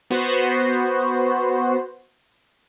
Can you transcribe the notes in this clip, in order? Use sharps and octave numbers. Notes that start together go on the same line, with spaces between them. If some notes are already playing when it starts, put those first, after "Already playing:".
B3 F#4 C5